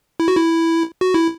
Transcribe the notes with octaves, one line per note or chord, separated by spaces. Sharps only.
E4
F#4
E4
F#4
E4